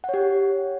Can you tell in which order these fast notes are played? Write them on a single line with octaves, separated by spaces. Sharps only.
F#5 C#5 G4